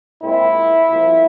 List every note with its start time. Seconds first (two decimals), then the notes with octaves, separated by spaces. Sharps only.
0.20 A#2 G#3 C4 E4
0.89 C2 A#2 F3